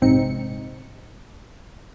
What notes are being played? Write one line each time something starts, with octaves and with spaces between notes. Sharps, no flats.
A#1 G#2 C3 C4 D#4 C#7